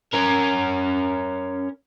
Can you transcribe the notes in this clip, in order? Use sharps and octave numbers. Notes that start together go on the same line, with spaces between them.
C#4 A#4